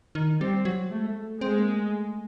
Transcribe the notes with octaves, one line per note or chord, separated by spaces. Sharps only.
D#3
G3 C4
F#3
G#3 A3
A3
G#3 C4
A#3
A3